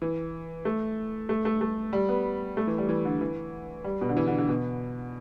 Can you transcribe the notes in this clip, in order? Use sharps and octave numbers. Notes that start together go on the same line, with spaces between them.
E3
A3
A3
A3
A3
G3
B3
A3
E3
G3
E3
D3
E3
G3
B2
D3
E3
D3
D3
B2